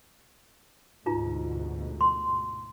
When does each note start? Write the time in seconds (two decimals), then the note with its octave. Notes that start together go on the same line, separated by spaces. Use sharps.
1.06 D2 G#2 B2 D#4 F4 A#5
2.01 C6